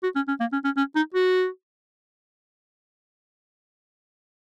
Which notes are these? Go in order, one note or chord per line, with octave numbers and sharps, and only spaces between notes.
F#4
C#4
C#4
A#3
C#4
C#4
C#4
D#4
F#4